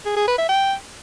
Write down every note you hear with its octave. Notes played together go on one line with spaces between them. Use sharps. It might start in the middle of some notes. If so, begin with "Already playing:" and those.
G#4
G#4
B4
E5
G5